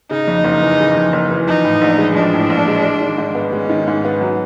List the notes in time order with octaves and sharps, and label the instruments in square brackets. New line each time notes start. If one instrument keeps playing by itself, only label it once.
[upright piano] C#3 [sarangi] D#4
[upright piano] F2
F#1
E3
C#3
F2
F#1
E3
[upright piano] F3 [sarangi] D#4
[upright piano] A2
A#1
G#3
[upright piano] F3 [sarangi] D4
[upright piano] A2
A#1
G#3
G#3
D#3
G#2
B3
[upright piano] G#3 [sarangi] C#4
[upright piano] D#3
G#2
B3
F#3